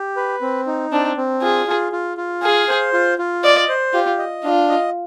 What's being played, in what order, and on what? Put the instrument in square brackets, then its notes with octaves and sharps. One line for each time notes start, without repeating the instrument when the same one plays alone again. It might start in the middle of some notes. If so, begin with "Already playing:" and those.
Already playing: [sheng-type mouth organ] G4
B4
C4
D#4
[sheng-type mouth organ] C4 [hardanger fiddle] D4
[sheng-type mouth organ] C4
[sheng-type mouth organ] F4 [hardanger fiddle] G#4
[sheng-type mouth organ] F4
F4
F4
[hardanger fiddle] G#4 [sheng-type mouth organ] F5
[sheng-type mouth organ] C5
F4
F4
[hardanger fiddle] D5 [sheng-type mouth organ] D#5
[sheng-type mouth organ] C5
[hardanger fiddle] F4 [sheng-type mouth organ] G4
[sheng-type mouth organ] D#5
[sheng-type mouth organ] D4 [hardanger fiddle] F4
[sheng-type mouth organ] D#5